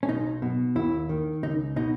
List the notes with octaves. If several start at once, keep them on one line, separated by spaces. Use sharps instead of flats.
C#4
B1 D#4
B2
D#2 E4
D#3
C#2 D#4
B2 D#4